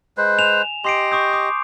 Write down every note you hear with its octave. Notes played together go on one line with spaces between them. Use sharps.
G#3 B4 C5
G#5 E7 F7
G4 D#5 C6 C7 D7
C#6 D#6 G6
D6 G6